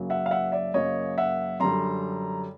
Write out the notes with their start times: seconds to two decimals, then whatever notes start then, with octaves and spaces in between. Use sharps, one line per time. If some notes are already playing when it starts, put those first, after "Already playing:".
Already playing: F#2 C#3 F#3 A#3
0.10 E5 F#5
0.26 F5
0.31 E5 F#5
0.52 D5 E5
0.74 F#2 C#3 F#3 A#3 C#5 D#5
1.18 E5 F#5
1.60 F#2 D3 G3 A#5 C6